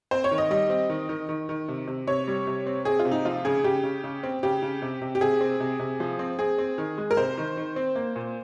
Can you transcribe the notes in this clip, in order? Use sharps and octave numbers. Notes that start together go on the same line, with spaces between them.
C4 C5
C#5
D#3
D#5
G3 D#5
C4
D#3
D#3
D#3
D#3
C3
C3
C3 C#5
G3
C3
C4
C4 G#4
F4
C3
D#4
F3 F4
C#3 G#4
C#3 G4
C#3
C#3
C4
C#3 G4
C#3
C3
C3
G4
C3 G#4
C4
C3
C3
F3
C4
C4 G#4
C4
D#3
G#3
A#4
C3 C5
D#3
D#3
C4
A#3
A#2